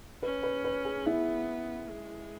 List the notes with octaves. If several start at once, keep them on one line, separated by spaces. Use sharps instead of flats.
C#4 B4
B4
B4
G#4
B3 E4
G#3